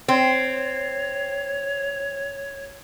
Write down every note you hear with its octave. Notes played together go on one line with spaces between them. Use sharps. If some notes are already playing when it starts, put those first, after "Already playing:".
C4 C#5